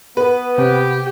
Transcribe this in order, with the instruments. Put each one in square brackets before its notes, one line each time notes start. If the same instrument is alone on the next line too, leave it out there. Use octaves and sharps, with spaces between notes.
[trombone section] B3 [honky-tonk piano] B4
[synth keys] C3 [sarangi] G4